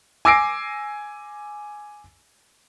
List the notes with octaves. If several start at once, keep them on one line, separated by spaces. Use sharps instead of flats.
G#5 D6 E6 A#6 C7 D7